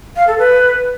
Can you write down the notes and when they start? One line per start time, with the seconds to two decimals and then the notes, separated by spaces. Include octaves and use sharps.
0.16 F5
0.27 A4
0.39 B4